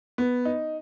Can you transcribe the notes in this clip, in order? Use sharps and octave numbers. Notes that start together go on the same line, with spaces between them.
B3
D#4